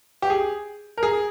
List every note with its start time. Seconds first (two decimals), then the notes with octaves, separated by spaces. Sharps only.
0.22 G4
0.30 G#4
0.97 A#4
1.03 G#4